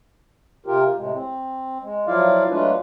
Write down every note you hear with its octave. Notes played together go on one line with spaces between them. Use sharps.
C3 F4 G4 A#4
A2 C3 G#3
C4
G#3
F3 F#3 E4 F4 D5 F5
F#3 G#3 A3 D4 F4 B4